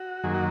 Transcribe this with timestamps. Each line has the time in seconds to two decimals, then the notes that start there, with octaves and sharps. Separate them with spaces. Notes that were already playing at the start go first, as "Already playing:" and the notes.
Already playing: F#4
0.23 F#2 D#3 F#3 A#3 G#4
0.34 F#4